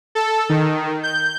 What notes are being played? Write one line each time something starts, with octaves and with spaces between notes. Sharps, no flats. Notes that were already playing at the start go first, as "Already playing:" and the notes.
A4
D#3
G6